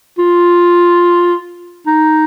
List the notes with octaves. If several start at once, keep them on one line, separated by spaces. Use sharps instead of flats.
F4
D#4